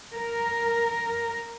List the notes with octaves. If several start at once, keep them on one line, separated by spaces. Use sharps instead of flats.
A#4